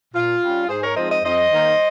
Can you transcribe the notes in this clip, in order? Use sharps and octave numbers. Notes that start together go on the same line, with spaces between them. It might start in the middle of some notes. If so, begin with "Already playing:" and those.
A#2 F4
G3 C#4
G#2 G#4 C5
A#4 C#5
F3 G#3 C4 D#4 C5 D#5
C5 D#5
F2 C5 D#5
D#3 A#3 D#4